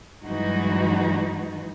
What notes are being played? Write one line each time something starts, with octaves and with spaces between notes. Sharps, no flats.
G2 E3 F#3 G#3 D#4 F#4